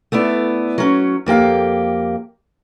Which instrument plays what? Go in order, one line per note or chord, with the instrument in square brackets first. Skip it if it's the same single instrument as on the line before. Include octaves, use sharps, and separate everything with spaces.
[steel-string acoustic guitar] A3 B3 E4 D5
F#3 C#4
F2 A#3 G4 F5